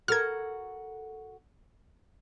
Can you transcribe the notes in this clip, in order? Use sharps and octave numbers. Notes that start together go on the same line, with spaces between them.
F#4 A4 A#4 F6 G#6